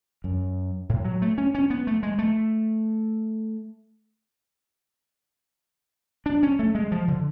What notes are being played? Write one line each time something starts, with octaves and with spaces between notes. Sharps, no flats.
F#2
A2
F#3
A3
C#4
C#4
B3
A3
G#3
A3
D4
C#4
A3
G#3
F3
D3